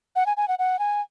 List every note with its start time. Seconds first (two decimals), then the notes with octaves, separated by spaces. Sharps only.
0.16 F#5
0.26 G#5
0.37 G#5
0.48 F#5
0.59 F#5
0.79 G#5